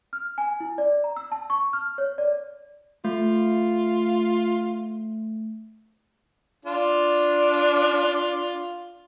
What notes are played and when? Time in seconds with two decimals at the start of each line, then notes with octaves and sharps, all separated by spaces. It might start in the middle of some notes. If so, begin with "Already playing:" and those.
0.13 F6
0.38 G#5
0.60 E4
0.78 D5
1.04 A#5
1.16 E6
1.32 A5
1.50 C#6
1.73 F6
1.98 C#5
2.18 D5
3.05 A3 F4
6.65 D4 F4